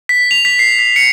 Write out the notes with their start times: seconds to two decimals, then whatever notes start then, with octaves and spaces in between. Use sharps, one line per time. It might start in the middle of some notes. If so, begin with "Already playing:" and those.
0.09 B6
0.31 F7
0.45 B6
0.59 C7
0.79 B6
0.96 C#7